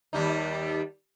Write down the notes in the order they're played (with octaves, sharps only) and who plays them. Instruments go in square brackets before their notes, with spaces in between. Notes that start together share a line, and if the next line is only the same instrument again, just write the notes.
[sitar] D#2 G3 D#4